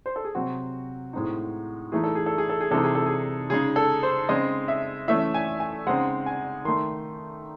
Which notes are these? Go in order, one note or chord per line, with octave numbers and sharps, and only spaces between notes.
C5
A4
G#4
C3 F#3 C4 F#4
A2 G#3 C4 D#4
E3 A3 D#4 G#4
A4
G#4
A4
G#4
A4
G#4
C3 E3 G#3 D#4 A4
G#4
A4
G#4
C#3 G#3 D#4 G#4
A4
C5
C#3 G#3 C4 D#5
E5
E3 A3 C#4 E5
G#5
G#5
C#3 G#3 C4 D#4 F#5
G#5
D#3 A3 D#4 C6